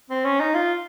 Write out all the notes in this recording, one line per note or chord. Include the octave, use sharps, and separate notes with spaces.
C4
C#4
D#4
F4